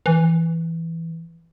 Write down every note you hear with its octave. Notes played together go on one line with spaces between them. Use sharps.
E3